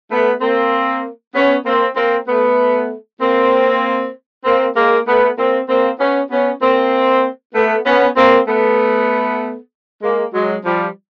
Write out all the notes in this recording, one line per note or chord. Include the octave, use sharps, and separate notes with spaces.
A3 B3
A#3 C4
B3 C#4
A#3 C4
A#3 C4
A3 B3
A#3 C4
A#3 C4
G#3 A#3
A3 B3
A#3 C4
A#3 C4
B3 C#4
B3 C#4
A#3 C4
A3 B3
B3 C#4
A#3 C4
A3 B3
G#3 A#3
F#3 G#3
F3 G3